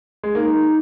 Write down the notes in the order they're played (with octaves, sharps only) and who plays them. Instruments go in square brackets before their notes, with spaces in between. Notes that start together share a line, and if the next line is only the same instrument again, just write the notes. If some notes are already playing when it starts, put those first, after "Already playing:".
[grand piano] G#3
[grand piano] A#3 [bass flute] D#4